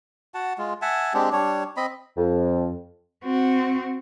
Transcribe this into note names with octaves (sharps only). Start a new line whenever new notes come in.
F#4 F#5 A5
G#3 F4
E5 F#5 G#5 A5
G#3 C4 D4 G4
G3 D4 C#5
C4 D#5 B5
F2
C4 F#4